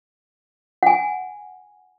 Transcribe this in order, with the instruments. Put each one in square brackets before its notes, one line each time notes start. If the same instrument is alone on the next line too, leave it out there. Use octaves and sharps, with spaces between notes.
[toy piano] F#5 G#5